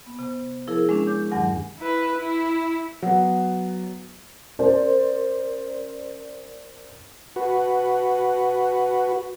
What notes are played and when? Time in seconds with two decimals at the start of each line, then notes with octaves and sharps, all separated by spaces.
0.06 B3
0.19 C3
0.67 F3 E4 G#4 A#4
0.89 G#3 C#4 D4
1.07 C#5 D6 G6
1.31 E2 G2 D#3 F#3 F#5 G#5
1.79 E4 B4
2.18 E4
3.02 F#3 B3
4.59 C#4 A#4 C5 D5
7.36 F#4 B4